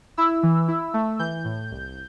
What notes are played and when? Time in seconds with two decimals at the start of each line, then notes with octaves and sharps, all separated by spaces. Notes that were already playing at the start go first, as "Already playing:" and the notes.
0.17 E4 E6
0.43 E3
0.68 E4
0.94 A3
1.19 E3 G6
1.45 A2
1.71 C2